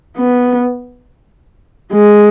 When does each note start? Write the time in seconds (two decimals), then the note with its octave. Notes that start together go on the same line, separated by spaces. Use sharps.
0.17 B3
1.92 G#3